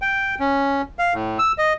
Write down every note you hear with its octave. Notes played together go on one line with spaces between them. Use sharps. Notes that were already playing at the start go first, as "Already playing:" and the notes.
G5
C#4
F5
A2
E6
D#5